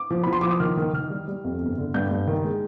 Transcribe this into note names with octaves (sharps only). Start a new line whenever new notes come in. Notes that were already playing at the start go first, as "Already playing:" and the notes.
Already playing: D6
F3
F3 B5
C6
F3 D6
D#6
D#3 F6
D#3
D#3 F6
G3
G3
F2
G1
D3
G2 G6
G2
D#3
G#3